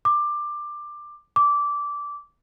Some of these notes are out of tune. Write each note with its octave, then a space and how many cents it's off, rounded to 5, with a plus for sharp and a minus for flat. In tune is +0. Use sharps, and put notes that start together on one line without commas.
D6 +15
D6 -15